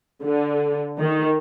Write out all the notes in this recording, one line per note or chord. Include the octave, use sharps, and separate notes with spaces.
D3
D#3